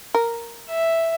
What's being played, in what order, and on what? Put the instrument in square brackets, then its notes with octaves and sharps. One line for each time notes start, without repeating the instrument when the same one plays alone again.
[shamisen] A#4
[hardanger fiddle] E5